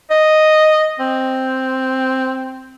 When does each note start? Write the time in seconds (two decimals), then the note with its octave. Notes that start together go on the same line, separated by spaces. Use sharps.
0.11 D#5
1.00 C4